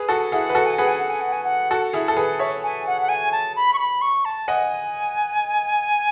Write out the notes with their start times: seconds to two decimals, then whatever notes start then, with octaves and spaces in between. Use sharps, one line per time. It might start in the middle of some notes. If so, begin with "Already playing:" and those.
Already playing: G#4 B4
0.09 F#4 A4
0.32 E4 G#4 F#5
0.50 B4
0.55 F#4 A4 F#5
0.66 G#5
0.77 G#4 B4 F#5
0.88 G#5
0.99 F#5
1.10 G#5
1.21 F#5
1.32 G#5
1.44 F#5
1.71 F#4 A4
1.93 E4 G#4
2.08 A4
2.16 G#4 B4
2.39 C#5 E5
2.63 G#5
2.86 F#5
3.01 F#5
3.09 G#5
3.32 A5
3.56 B5
3.73 C#6
3.78 B5
4.01 C#6
4.25 A5
4.47 D#5 F#5 G#5